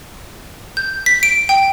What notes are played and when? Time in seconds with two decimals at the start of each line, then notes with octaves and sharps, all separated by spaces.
0.77 G6
1.06 B6
1.23 D7
1.49 G5